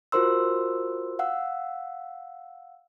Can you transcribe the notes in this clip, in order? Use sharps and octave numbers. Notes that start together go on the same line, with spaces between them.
F4 F#4 A#4 C5 C6 E6
F5 F#5 E6